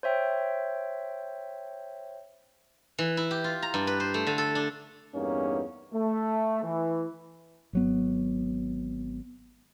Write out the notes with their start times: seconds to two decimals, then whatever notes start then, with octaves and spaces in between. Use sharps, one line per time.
0.03 C5 C#5 E5 G5
2.98 E3
3.17 E4
3.31 G4
3.44 F4
3.62 A#5
3.74 G2
3.87 B4
4.00 C5
4.14 A3
4.27 D3
4.38 A4
4.55 D4
5.14 E2 G2 A#3 C#4 D#4
5.93 A3
6.63 E3
7.73 G#1 F#3 B3